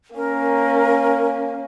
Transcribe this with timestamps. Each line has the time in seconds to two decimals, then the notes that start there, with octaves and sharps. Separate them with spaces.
0.16 A#3 C#4 A#4